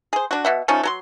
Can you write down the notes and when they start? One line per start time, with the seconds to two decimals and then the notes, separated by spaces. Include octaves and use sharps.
0.13 G#4 C5
0.31 D4 F#4
0.45 B2 E5 F#5
0.68 F3 A3 C#4 D#4
0.83 F#3 A4 C6